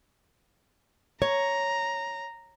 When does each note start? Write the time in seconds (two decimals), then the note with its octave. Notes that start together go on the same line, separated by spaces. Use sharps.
1.22 C#5 A#5